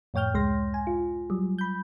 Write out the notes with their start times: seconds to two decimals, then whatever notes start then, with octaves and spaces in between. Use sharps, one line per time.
0.14 F2 A2 C#5 G5 F6 G6
0.34 C#2 G#3 C6 A#6
0.74 G#5
0.87 F4
1.30 F#3 G3
1.58 B5 G6